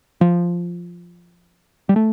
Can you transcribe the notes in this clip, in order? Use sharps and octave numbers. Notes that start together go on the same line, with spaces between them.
F3
G3
A3